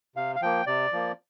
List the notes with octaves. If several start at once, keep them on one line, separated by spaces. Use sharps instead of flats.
C3 F5
F5
F3 A#3 G5
C3 D5
F3 A#3